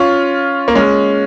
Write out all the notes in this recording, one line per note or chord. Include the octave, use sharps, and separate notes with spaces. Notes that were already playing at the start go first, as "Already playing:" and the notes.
Already playing: C#4 F4
A#3
G#3 C#4